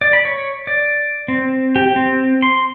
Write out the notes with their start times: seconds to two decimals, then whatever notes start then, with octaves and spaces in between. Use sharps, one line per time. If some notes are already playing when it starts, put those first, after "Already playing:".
0.01 D5
0.13 B5
0.25 C#5
0.67 D5
1.28 C4
1.76 G4
1.96 C4
2.42 C6